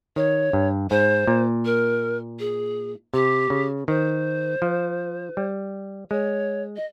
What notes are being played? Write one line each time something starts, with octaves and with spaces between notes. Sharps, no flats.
D#3 C#5
G2
G#2 C5
A#2
A#4
G#4
C3 G4
C#3
D#3 C5
F3
G3
G#3 C#5
D#5